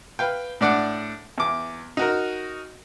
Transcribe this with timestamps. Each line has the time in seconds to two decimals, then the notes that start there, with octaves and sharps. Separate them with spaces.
0.19 B4 F5 G5
0.61 A2 D4 D5 F#5
1.38 E2 D6
1.97 D#4 F#4 A#4